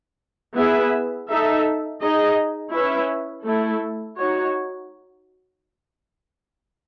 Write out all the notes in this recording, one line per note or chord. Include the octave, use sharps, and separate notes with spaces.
B3 E4 G#4 B4 E5
D#4 A4 E5
D#4 G#4 D#5
C#4 E4 B4 E5
A3 E4 A4
D#4 F#4 C#5